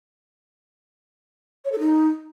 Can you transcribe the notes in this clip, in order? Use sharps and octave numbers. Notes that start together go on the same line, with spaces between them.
C#5
A4
D#4